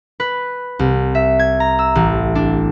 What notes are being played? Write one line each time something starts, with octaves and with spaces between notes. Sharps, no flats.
B4
C2
E5
G#6
A#5
E6
A1
D4